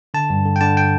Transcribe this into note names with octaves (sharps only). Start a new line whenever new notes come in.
D3 A5
G2
D3
G5
D3 A5
G5